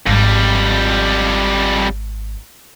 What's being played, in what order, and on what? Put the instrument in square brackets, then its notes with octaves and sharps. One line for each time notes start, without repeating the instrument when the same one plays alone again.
[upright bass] G#1 [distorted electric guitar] F2 G3